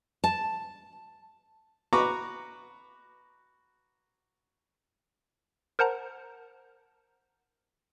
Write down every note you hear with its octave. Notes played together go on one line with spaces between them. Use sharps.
A5
F#4 B4 A#5 C#6 D6
A#4 C5 F#5 A5 A#5